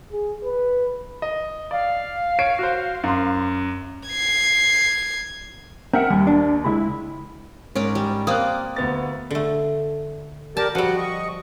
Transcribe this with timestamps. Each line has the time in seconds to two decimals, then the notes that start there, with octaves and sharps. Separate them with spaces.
0.12 G#4
0.44 B4
1.22 D#5
1.71 D5 F5
2.39 C#5 C7 D7
2.59 F#4 C5
3.04 F#2 C6
4.09 G#6 C7
5.93 C4 A#4 E5 F#5
6.10 D#2 G3
6.27 D4
6.65 C#2 G#3 E4 B5
7.75 G#2 C#4 A#4 D5
7.95 G3
8.27 A#3 C4 D5 D#6 F#6
8.76 D2 B3 A6
9.31 D3 A3
10.57 G4 A#4 D5 A5
10.75 F3 G3 F#4 F#5
10.97 D#5 C#6